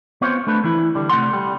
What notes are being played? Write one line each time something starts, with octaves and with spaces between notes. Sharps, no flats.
B3 C4 F4 C5 C#5
A3 D4 B4
E3 E4
D3 G3
C3 A3 A4 F#5 C6
G3